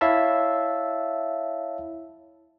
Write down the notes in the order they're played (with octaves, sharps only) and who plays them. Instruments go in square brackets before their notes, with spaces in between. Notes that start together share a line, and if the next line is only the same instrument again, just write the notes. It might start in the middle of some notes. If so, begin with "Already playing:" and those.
[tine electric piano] E4 C#5 E5 F5 A5